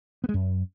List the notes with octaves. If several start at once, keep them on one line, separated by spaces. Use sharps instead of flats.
B3
G#3
F#2